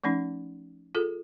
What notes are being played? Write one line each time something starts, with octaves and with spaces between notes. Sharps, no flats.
F3 A3 C#4 D#4
F4 G#4 A4